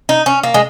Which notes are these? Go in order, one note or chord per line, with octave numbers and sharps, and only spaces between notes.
D#4
C#4
A#3
G#3